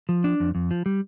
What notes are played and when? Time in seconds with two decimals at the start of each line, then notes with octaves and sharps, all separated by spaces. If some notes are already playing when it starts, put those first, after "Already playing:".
0.09 F3
0.24 D4
0.40 F2
0.55 F2
0.71 F3
0.86 G3